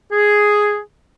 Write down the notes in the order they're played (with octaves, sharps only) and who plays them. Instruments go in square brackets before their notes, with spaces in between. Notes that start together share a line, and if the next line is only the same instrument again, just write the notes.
[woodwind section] G#4